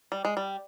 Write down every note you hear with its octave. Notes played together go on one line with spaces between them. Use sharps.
G3
G#3
G3